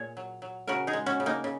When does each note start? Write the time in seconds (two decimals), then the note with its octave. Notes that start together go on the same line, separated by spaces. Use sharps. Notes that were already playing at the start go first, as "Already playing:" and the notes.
Already playing: A#2 G#4 C#5
0.17 F#3
0.42 F#3
0.67 C#3 F#4 A#4
0.87 D#4 G#4
0.93 G#3
1.06 C#4 F#4
1.20 C#3
1.26 A#3 D#4
1.44 C#3